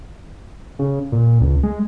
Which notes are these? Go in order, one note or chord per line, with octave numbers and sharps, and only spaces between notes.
C#3
A#2
C#2
G#3